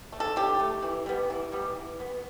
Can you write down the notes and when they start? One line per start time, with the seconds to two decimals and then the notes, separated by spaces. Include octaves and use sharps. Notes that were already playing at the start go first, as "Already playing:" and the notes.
0.12 A3
0.20 A4
0.36 D3 G4
0.60 A3
0.82 E3
1.06 G3 B3
1.30 E3
1.52 G3 B3
1.76 E3
2.00 B3